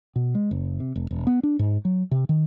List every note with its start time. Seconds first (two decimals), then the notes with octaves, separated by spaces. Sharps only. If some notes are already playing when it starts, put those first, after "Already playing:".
0.16 B2
0.35 G#3
0.51 F#1
0.80 C3
0.96 F1
1.11 E1
1.27 B3
1.43 D4
1.59 G#2
1.85 F#3
2.11 C3
2.29 D#3